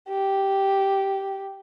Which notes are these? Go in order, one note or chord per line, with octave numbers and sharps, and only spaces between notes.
G4